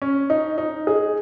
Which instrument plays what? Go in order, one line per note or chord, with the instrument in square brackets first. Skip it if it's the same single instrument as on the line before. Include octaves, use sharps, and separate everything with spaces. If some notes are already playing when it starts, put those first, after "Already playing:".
[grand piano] C#4
D#4
D#4
G#4